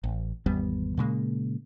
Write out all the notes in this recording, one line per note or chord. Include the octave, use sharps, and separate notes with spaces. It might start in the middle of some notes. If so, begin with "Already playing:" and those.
A1
G#1 E2 G3 B3
A#2 C#3 G#3 A#3